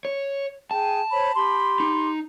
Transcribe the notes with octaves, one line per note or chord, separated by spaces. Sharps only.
C#5
G#4 G5 A5
C5 C#5 B5
G4 B5 C6
D#4